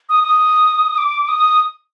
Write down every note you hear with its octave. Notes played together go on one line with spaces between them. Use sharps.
D#6
D#6
D6
D#6